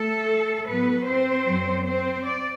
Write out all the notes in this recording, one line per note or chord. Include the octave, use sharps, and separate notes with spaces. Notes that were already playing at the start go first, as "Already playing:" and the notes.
Already playing: A3 A4
A2 F#3 B3 B4
C4 C5
F#2 F#3
C4 C5
D5